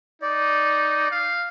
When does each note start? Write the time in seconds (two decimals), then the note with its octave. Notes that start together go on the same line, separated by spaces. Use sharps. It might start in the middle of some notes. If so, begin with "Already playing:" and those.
0.22 D#4 D5
1.11 F5